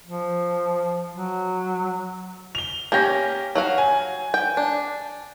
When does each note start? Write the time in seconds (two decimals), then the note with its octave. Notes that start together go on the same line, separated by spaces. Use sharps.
0.06 F3
1.13 F#3
2.55 F7 G7
2.92 A#3 C#4 G4 G6 A#6
3.55 F#3 F#4 F5
3.78 G#5
4.34 G5
4.57 D4